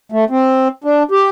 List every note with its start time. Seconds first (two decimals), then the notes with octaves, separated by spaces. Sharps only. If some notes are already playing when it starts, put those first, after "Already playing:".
0.12 A3
0.30 C4
0.84 D4
1.11 G4